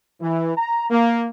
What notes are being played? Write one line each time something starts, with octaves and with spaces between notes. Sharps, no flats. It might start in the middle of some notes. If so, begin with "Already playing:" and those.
E3
A#5
A#3